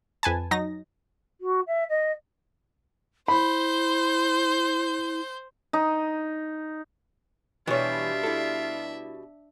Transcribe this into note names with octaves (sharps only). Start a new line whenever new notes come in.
F2 B4 G#5 A5
F#3 D#4 A#6
F#4
E5
D#5
E4 C5 B5 G6
D#4
B2 E3 G3 D4 F4 C#5 E5
E4 A4